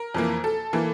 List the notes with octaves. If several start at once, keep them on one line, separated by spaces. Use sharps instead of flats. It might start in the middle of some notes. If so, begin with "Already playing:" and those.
Already playing: A#4
F2 E3 A#3
A4
E3 A#3